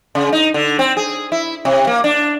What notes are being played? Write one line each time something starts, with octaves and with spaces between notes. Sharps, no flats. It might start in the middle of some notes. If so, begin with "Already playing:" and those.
C#3
D#4
D3
C4
G#4
E4
C3
A#3
D4